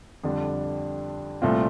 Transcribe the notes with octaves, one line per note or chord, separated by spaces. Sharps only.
F2 D3 G3 D4
C2 A#2 A3 C4 F4